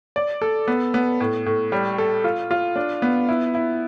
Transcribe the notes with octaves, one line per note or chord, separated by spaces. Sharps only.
D5
A4
B3
B3
A2
A2
G3
A4
F4
F4
D4
B3
E4
E4